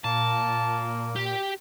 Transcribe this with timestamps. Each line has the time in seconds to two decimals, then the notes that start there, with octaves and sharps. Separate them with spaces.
0.04 A#2 A#3 A5
1.16 G4